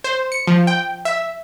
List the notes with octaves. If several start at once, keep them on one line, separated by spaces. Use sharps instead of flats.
C5
C#7
F3
G5
E5